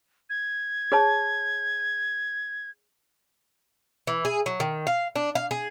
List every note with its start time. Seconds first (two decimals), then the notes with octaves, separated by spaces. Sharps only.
0.30 G#6
0.92 G#4 C#5 A5
4.07 E3
4.25 G#4
4.46 F#3
4.60 D#3
4.87 F5
5.16 D4
5.35 F5
5.51 G#4